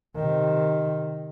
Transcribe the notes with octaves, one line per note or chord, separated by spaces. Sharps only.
C3 D#3